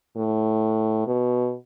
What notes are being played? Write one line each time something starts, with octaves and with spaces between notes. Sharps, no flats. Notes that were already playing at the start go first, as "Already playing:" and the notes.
A2
B2